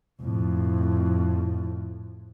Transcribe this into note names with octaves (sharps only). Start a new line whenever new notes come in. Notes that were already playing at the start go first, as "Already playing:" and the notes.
F2 A2